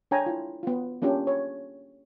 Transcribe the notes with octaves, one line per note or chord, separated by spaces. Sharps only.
D4 C#5 G5 G#5 A#5
E4 F4
B3 F4
A#3 C#4 D4 F4 G4
C#5